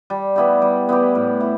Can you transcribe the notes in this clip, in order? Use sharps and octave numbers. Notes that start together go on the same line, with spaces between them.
G3
B3 E4 G4
G3
B3 E4 G4
A2
E4